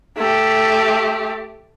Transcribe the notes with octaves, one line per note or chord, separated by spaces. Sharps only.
A3 G4